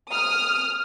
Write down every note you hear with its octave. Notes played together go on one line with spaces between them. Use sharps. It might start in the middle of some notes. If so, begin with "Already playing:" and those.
D#6 F6